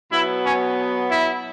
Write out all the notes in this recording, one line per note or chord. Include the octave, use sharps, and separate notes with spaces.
B2 F#3 B3 E4
C#4
E4